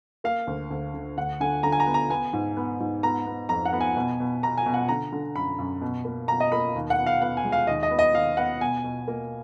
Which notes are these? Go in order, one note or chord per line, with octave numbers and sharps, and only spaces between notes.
A#3 F5
D2
D2
D3
D2 F#5
D3 G#5
D3 A#5
G#5
A#5
B3
A#5
B3 G#5
G#2
B3
G#2
B3 A#5
B3
F2 A#5
F#5
B3
G#5
B2
B2
B2 A#5
G#5
B2
F#5
D3 A#5
D3
F#2 B5
F#2
B2
A#3
B2 A#5
D#5
A#3 B5
D#2
F#5
B3
F5
B3 F#5
G#5
G#3
F5
D#2 D#5
D#5
B3
D#5
D#2 F5
B3 F#5
B2 G#5
B2
A#3